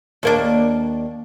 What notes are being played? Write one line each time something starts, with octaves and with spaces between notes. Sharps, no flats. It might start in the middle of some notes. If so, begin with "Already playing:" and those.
D#2 A#3 D4